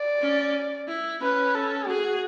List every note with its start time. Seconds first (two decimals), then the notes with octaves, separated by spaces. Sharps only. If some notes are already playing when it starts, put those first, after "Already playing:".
Already playing: D5
0.21 C#4
0.88 E4
1.22 C#4 B4
1.55 A4
1.88 F#4 G#4